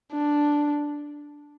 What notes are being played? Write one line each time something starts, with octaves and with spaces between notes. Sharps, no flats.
D4